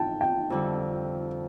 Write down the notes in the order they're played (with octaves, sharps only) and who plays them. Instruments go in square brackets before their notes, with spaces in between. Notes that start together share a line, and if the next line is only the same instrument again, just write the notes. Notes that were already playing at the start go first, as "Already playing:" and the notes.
Already playing: [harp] E3 [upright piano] G5 A5
[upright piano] G5
[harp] F2 D3 G3